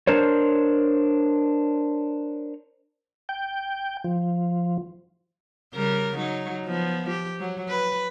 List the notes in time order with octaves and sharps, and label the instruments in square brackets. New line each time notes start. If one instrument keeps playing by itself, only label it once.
[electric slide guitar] D4 A#4 C5 C#5
[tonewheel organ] G5
F3
[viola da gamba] C#3 G3 A#4
F#3 D#4
F3 B3
G4
F#3
B4